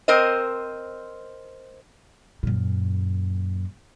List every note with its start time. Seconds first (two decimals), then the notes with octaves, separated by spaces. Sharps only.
0.08 C4 A#4 C5 D#5
2.43 F#2 A#2